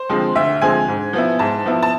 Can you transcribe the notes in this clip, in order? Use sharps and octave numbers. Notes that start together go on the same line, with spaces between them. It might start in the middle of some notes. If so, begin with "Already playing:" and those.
Already playing: C5
D3 F3 G#3 C4
D2 E5
D3 F3 G#3 C4 G#5
G#2
F3 B3 E4
G#2 A5
F3 B3 E4
A5